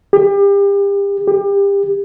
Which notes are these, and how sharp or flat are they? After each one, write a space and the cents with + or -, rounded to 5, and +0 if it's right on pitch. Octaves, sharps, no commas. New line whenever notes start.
G4 +35
G4 +30